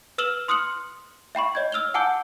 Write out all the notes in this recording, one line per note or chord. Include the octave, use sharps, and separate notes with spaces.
B4 E6 F6 E7 F#7 G7
C6 D#6 F6 F#6 C#7 F#7
E5 G5 B5 C#6
C#5 D#5 G6 G#6
E6 F6 F7 G7
F#5 G#5 A5 D6 E6 G6